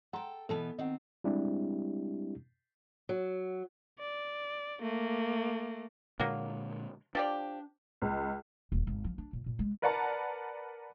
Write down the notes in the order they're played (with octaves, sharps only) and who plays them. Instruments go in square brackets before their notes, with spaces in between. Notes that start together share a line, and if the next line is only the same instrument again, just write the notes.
[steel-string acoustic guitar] A4 G5 [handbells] F#5 A#5 C6
[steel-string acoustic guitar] B2 E3 B3 [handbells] A4 A5
[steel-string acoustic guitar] D#3 C4 [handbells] D#5 F#5
[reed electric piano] G3 G#3 C4 D4 E4 G4
[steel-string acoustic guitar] F#3
[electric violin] D5
A3 A#3
[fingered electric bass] A#2 D3 G#3 [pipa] F#3 A#3
[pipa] F3 G4 D5 [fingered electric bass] D4
[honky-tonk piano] C#2
[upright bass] D#1
G#1
F3
D4
A#2
A#2
G#3
[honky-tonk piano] A#4 B4 D5 F#5 A5 A#5